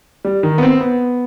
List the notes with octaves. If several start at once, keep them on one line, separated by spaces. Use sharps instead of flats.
G3
D#3
B3
C4
B3